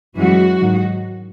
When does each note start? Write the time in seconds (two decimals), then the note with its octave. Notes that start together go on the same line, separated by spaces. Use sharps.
0.16 F#2 E3 G#3 F#4
0.59 G#2 D#3 F#3